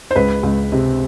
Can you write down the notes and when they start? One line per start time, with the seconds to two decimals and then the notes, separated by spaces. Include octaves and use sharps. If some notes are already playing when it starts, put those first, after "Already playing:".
0.11 C5
0.16 C#2 B4
0.43 C#2
0.72 C3